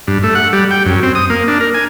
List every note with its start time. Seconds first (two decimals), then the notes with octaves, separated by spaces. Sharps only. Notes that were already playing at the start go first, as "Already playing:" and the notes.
0.07 G2
0.23 A3
0.35 F#5
0.53 G3
0.71 G5
0.86 F#2
1.03 C4
1.15 D#6
1.30 A#3
1.48 D4
1.60 A#4
1.74 G#5